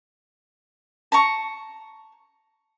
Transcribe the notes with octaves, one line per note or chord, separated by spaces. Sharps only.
A5 A#5 C#6